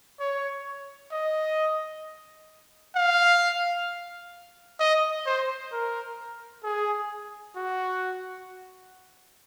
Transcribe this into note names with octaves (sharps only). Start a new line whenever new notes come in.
C#5
D#5
F5
D#5
C5
A#4
G#4
F#4